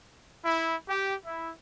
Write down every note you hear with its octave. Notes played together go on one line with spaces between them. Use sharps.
E4
G4
E4